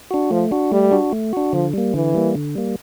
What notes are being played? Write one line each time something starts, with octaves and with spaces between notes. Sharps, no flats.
D4 F#4
F3 A3
D4 F#4
G3 A3
D4 F#4
A3
D4 F#4
D3 F3
G3 A#3
D3 E3
G3 A#3
D3
G3 A#3